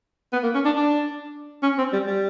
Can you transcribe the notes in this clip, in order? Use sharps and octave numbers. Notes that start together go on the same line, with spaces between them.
B3
A#3
C#4
D4
D4
C#4
C4
G3
G3